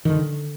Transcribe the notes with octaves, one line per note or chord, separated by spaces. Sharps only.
D3 D#3